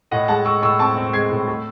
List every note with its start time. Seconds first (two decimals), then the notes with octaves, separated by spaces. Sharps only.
0.11 A2 D#5 F#5
0.28 G#3 F#5 A5
0.45 G#3 C#6 E6
0.62 A2 C#6 E6
0.79 C4 A5 C#6
0.97 C4
1.13 G#3 G#6 C7
1.31 A2
1.47 A3